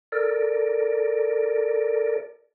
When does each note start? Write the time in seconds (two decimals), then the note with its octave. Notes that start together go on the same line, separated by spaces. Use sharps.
0.12 A4 A#4 D5